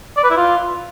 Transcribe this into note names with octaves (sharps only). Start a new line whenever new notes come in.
D5
B4
E4
F4